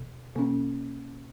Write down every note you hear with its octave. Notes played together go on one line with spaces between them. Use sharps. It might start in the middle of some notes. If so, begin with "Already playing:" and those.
Already playing: B2
B2 A#3 C#4